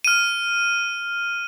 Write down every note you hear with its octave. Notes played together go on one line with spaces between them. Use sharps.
F6 D#7